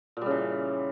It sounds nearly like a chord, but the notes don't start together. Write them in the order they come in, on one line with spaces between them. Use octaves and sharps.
A#2 G3 C#3 E3